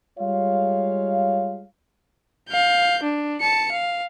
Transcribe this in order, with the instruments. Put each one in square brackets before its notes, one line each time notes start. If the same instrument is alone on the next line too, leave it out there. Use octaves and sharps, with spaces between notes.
[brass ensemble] G3 G#3 F4 C#5 F5
[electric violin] F5 G6
D4
A5 C#7
F5